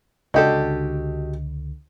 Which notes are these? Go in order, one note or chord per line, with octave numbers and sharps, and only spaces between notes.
C#2 D3 F#4 G4 A4 D#5